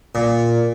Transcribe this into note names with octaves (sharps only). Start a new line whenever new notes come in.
A#2